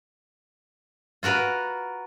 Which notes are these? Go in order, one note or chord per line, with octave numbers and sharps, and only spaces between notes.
F4 F#4 A#4 B4